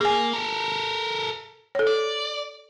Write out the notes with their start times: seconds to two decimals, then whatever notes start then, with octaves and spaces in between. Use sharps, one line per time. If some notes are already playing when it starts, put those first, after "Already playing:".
0.01 A#3 G#4 G#5
0.33 A4 A#4
1.75 A4 C#5
1.87 D5